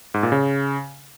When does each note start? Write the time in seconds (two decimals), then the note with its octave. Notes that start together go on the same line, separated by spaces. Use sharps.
0.14 G#2
0.23 A#2
0.32 C#3